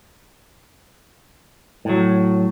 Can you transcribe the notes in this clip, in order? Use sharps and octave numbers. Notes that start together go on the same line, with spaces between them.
A2 F#3